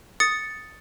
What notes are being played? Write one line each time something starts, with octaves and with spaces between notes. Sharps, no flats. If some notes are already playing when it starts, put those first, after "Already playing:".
D#6 A6 C#7